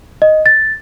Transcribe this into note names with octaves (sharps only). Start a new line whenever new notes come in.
D#5
A6